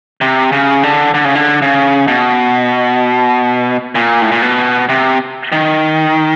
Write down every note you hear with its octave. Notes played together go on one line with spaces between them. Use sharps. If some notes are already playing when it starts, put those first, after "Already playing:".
C3
C#3
D3
D3
C#3
D3
C#3
B2
A#2
A2
A#2
B2
C3
D#3